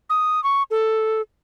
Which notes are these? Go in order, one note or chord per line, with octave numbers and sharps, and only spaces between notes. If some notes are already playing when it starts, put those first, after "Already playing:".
D#6
C#6
A4